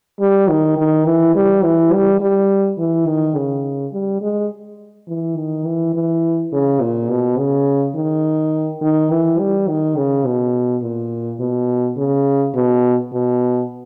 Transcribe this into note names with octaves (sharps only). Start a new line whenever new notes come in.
G3
D#3
D#3
E3
G3
E3
G3
G3
E3
D#3
C#3
G3
G#3
E3
D#3
E3
E3
C#3
A#2
B2
C#3
D#3
D#3
E3
G3
D#3
C#3
B2
A#2
B2
C#3
B2
B2